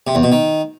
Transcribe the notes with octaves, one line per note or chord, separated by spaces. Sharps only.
C3
E2
B2
D#3